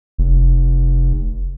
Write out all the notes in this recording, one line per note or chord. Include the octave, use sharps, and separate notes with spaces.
F1